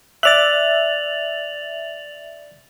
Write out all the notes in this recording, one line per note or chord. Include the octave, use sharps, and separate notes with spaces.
D5 E5 F#6 A6 F7 F#7